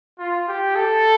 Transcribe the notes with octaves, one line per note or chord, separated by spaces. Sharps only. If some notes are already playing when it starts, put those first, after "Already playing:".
F4
G4
A4